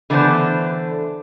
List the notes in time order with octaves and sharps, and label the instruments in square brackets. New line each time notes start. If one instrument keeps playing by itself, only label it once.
[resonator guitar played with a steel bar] D3 E3 A3 B3 D4 C5